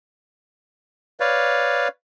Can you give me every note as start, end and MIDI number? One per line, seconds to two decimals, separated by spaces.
1.20 1.88 71
1.20 1.88 73
1.20 1.88 74
1.20 1.88 77